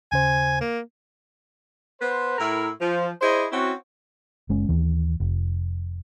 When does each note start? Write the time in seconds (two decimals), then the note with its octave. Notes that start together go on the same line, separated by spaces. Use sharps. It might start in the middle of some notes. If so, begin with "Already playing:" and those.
0.12 D#2 C#3 C5 G#5
0.61 A#3
2.00 B3 B4 C5
2.38 A2 E4 A#4
2.81 F3
3.21 E4 G#4 C5 D5 D#5
3.51 C4 C#4 E4 F#4
4.49 F#1 G#3 C#4
4.69 D#2 E3
5.20 F1